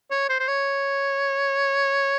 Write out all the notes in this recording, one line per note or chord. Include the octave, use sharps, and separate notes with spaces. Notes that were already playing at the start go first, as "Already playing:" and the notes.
C#5
C5
C5
C#5